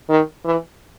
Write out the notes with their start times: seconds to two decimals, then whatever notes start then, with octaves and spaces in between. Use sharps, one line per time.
0.09 D#3
0.45 E3